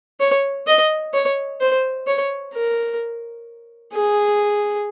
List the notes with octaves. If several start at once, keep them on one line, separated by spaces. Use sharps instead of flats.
C#5
D#5
C#5
C5
C#5
A#4
G#4